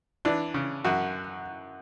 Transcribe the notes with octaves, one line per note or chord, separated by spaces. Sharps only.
E3 D4
C#3
F#2 F#4